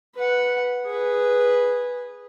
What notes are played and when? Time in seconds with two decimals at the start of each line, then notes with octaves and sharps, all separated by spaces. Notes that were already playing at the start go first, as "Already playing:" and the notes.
0.15 B4 F#5
0.86 G#4 B4